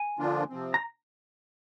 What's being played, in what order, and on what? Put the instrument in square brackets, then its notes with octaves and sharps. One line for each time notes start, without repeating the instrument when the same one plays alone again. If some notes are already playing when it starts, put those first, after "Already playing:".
Already playing: [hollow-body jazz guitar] G#5
[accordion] D3 F3 A#3 D4 F4
C3 F3 C4
[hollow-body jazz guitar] A#5